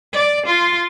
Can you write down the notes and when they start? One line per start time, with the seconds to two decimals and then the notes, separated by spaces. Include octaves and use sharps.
0.13 D5
0.46 F4